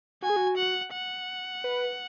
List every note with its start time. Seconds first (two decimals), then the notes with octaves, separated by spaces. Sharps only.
0.22 F#4 G#5
0.30 G#4
0.36 F#4
0.57 F#5
0.93 F#5
1.64 B4